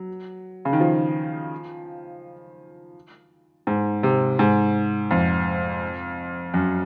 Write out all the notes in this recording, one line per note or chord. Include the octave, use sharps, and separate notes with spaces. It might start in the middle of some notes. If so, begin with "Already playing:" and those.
Already playing: F#3
C#3
D#3
F3
G#2
C3
G#2
F2
F#2